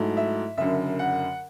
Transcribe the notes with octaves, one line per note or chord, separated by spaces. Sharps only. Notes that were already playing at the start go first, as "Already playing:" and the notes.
Already playing: G#2 F#3 A3 E4
E5
F#1 F#2 D3 E5
F#5